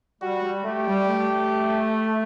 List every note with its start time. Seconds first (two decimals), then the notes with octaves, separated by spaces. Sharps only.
0.22 G3 F#4
0.43 G3
0.65 A3 G4
0.87 G3
1.08 A3